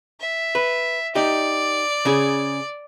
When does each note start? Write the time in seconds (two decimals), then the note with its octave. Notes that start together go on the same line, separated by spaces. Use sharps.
0.20 E5
0.55 B4
1.15 D#4 G4 D5
2.05 C#3 G#4